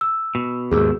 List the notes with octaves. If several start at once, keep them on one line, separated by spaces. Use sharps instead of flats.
E6
B2
D#2 G#2 G#4 E6